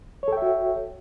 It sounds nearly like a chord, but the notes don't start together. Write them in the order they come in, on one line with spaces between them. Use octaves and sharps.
C#5 A4 G5 E5 F#4